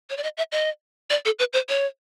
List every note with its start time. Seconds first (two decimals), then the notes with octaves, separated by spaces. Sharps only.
0.10 C#5
0.17 D5
0.23 D#5
0.37 E5
0.52 D#5
1.10 D5
1.25 A4
1.39 B4
1.53 C5
1.69 C#5